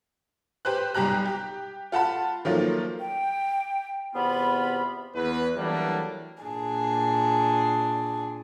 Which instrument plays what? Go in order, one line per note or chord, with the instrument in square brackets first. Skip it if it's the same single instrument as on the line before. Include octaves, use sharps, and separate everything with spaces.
[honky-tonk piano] G4 B4 C5 F#6
B1 G3 G4 A#5 F#6
G4
F4 F#5 A5 B5
D#3 F3 F#3 A3 A#3 F4
[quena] G5
[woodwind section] E2 C3 B3 F4 B5
[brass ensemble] E2 B4
E3 F#3 G3 A3 A#3 D4
[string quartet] A#2 D4 G#4